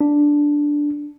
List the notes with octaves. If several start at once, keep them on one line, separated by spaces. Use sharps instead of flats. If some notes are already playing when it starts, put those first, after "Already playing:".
D4